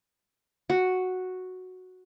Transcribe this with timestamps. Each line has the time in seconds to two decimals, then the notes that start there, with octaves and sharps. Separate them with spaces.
0.70 F#4